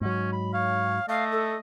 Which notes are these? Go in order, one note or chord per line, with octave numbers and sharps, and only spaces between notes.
G#2 F#3 C#4
B5
C#5 F5
A3 D#5 F5
A4